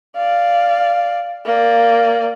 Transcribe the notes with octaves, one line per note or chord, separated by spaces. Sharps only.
D5 F5
A#3 D5